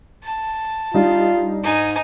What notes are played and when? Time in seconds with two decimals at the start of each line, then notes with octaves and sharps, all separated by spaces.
0.24 A5
0.94 G3 D4 D#4 F4
1.64 G#2 D#4 G#5